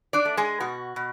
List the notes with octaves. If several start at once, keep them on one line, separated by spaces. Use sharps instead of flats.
D4 D5
A3
G#3 G#4
B2 F#4
B2